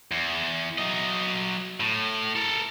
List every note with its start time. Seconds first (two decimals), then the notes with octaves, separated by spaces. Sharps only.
0.12 E2
0.78 F#3 D#5
1.80 A2
2.36 A4 A#4